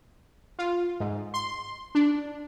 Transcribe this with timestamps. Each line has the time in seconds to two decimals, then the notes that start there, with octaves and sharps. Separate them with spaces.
0.59 F4
1.00 G#2
1.34 C6
1.95 D4